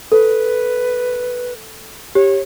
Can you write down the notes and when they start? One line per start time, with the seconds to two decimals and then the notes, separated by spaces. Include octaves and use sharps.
0.12 A4 B4
2.15 G4 C#5